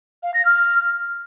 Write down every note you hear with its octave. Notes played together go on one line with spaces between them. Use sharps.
F5
A#6
F6